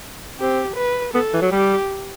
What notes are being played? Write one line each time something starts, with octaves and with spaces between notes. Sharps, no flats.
C4 G4
B4
B3 A4
E3
F#3
G3 G4